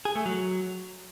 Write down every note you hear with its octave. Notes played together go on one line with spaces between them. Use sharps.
G#4
A3
F#3